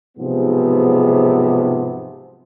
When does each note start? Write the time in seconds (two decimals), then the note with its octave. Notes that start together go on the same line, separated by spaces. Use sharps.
0.17 B1 G#2 C3 F3 B3 G#4